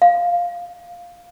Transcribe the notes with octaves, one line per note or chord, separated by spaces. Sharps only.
F5